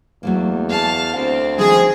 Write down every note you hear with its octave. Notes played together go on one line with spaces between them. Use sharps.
E2 F#3 A3 A#3
G#4 C#5 F5 A5
D2 C4
D#3 F3 G#3 G#4